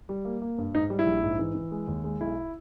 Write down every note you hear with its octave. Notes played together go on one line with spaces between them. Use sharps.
G3
A#3
A#3
G2
G#2 D#4
G3
E4
A#1
G#2
E3
E3
G#3
D#2
G#3
B1 E4